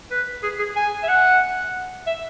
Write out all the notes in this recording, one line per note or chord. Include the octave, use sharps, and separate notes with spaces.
B4
G#4
G#4
G#5
E5
F#5
E5